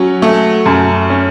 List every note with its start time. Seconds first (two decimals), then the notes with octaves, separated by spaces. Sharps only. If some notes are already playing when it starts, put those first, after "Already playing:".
Already playing: F#3 C#4
0.22 A3
0.66 F#2
1.10 C#4